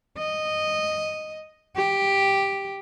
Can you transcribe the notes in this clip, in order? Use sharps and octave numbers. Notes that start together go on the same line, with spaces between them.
D#5
G4